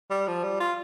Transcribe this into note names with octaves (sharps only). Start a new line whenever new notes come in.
G3
F3
G3
F4